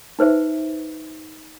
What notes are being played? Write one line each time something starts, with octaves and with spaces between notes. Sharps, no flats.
D#4 B4 C5 E5